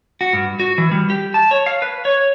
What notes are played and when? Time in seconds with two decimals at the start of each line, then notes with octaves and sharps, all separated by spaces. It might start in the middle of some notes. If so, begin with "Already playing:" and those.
0.21 F#4
0.33 G2
0.60 F#4
0.78 E3
0.91 G3
1.10 G4
1.34 A5
1.51 C#5
1.66 F5
1.82 B4
2.05 C#5